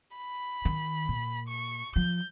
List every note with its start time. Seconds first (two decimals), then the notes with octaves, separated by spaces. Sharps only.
0.17 B5
0.65 D#3
1.09 A#2
1.49 C#6
1.96 F3 G6